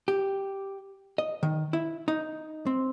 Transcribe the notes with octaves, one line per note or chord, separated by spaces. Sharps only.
G4
D#5
D#3
E4
D#4
C4